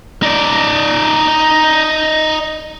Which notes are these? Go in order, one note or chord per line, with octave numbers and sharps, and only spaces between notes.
D#4 D5